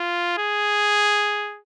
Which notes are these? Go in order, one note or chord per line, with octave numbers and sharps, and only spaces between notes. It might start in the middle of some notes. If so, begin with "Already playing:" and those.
Already playing: F4
G#4